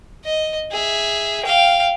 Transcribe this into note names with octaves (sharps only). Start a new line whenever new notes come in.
D#5
G#4 E5
F5 G5